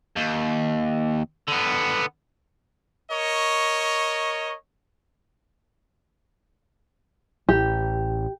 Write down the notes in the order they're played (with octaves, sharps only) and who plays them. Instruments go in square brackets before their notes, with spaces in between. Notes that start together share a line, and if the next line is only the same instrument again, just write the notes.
[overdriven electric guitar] D#2
D3 B3
[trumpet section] A#4 C#5 D#5 C#6
[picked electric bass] A1 [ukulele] G4